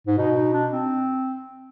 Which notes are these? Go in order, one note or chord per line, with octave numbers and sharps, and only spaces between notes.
G#2
B2 D#4
D#4
D4
C4